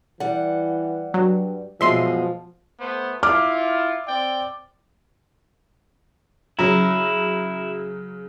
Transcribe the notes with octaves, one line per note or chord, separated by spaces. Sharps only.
E3 G3 F#5
G2 F#3
F#2 B2 F3 G#3 E5 C6
A3 B3 C5
E4 F4 D6 F6
C4 D5 G5
C#3 F#3 E4 A#5